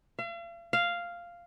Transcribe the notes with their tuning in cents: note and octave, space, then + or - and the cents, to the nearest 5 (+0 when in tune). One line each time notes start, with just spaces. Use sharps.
F5 -45
F5 -5